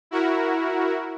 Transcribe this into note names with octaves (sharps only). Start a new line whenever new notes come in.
E4 F#4 A#4